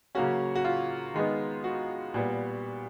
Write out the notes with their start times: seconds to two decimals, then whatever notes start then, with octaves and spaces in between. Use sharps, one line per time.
0.15 C#3 F#3 A#3 C#4 F#4
0.56 F#4
0.65 F4
1.14 D#3 G#3 B3 D#4
1.64 F#4
2.14 A#2 G3 B3